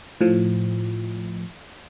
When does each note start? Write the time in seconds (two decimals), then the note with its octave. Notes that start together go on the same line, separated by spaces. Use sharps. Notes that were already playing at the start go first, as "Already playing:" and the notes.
0.21 A2 F3